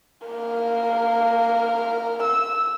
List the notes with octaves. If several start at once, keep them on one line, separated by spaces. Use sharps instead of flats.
A#3 A#4
E6